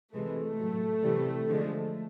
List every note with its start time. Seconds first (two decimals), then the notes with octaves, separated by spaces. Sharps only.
0.14 C3 E3 G#3 A3
0.59 A2 F#3
1.03 C3 E3 G3
1.47 D3 F3 G#3